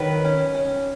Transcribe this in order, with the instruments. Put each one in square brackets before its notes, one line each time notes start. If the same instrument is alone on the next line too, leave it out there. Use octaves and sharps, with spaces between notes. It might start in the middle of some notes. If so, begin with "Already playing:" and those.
Already playing: [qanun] D#3 F#3 B4
C#4
C#4